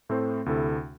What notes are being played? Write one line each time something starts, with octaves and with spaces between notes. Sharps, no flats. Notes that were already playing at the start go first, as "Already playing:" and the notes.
A2 A3 C4 A4 C5
D2 C3 A3 E4 A4